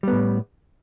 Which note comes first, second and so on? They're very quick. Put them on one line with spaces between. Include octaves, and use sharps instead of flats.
G3 B3 A2